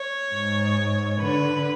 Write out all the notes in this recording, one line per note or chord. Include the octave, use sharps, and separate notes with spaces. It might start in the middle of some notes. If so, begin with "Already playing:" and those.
Already playing: C#5
G#2
D3 B4